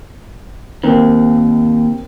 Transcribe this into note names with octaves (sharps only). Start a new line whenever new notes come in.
D#2 C4 A#4